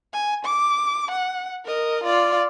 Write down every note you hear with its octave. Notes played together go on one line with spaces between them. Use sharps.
G#5
D6
F#5
A#4 D#5
F4 D5